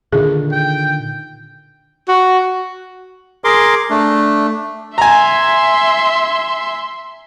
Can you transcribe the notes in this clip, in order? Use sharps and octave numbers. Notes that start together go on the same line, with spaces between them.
A#2 D3 D#3 G#4
G5
F#4
G#4 A#4 C6 D6
A3 D4
E5 G#5 A#5 C6